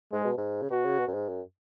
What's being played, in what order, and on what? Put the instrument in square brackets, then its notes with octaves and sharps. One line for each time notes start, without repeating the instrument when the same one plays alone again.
[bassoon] G#2 [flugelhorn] G#3
[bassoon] B2
G#2
C#3
[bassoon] B2 [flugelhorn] F#4
[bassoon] C#3
B2
F#2
G#2
F#2